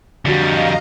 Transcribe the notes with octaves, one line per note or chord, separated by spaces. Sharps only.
F2 D3 G3 F#4 D#5 F5 A#5